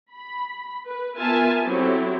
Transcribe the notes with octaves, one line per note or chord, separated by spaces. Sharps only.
B5
B4
B3 F4 A#4 E5 G#5 A5
F#3 C4 E4 G4 A4